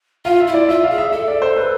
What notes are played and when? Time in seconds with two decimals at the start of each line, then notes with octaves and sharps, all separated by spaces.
0.25 F4 F5
0.40 E5
0.47 E4
0.54 D5
0.69 F4 E5
0.83 F5
0.90 G#4
0.98 E5
1.12 A4 E5
1.28 D5
1.42 C5
1.56 B4